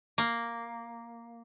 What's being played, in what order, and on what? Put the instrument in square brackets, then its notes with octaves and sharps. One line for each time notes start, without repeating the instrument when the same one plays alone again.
[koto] A#3